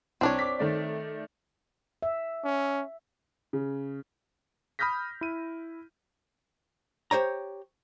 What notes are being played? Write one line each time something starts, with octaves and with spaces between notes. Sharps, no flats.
C2 C4 D4 C#5
D6 B6
D#3 A3 D5
E5
C#4
C#3
B5 D#6 F6 G6 A#6 B6
E4 D#7
G4 C5 C#5 A#5